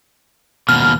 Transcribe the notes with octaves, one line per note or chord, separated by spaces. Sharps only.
D#2 B2 F6